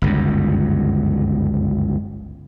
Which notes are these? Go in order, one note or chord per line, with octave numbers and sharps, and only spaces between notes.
G1 C#2 F#2